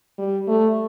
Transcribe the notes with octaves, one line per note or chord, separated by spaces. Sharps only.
G3
A3